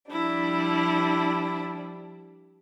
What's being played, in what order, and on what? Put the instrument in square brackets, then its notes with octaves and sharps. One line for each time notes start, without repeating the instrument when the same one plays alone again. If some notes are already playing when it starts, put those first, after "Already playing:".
[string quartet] F3 G3 D4 [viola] E4